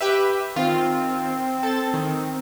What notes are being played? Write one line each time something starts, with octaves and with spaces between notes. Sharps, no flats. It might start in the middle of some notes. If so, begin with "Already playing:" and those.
G4 B4 E5
D#3 C4 F4
A4 A6
D#3